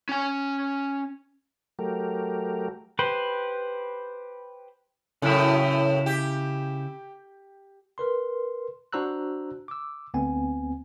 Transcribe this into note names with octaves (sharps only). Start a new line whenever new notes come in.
C#4 G#5
F#3 A3 G4 A#4
G4 B4 C5
F#2 A2 C#3 E4
G4
A#4 B4 C6
D4 F#4 C5 A#5 E6 F#6
D6 E6
D2 B3 C4 G#5